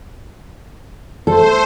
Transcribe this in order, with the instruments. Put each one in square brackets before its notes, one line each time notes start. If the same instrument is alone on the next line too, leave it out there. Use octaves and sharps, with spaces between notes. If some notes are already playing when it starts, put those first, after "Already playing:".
[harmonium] A3 [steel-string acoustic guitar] A4 [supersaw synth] C5